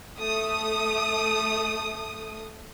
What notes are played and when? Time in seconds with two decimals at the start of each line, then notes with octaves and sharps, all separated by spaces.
0.19 A3 D#6